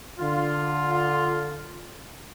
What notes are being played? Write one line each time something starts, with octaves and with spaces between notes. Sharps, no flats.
D3 F4